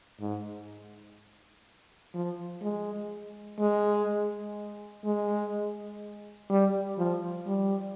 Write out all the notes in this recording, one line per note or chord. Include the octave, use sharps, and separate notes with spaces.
G#2
F3
G#3
G#3
G#3
G3
F3
G3